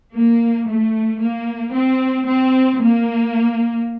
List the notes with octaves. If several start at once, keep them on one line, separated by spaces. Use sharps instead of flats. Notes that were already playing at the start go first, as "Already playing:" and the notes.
A#3
A3
A#3
C4
C4
A#3